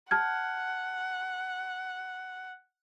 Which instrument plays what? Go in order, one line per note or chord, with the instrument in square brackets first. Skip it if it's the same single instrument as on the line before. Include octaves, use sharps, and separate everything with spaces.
[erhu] F#5 [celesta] A5 F6 G#6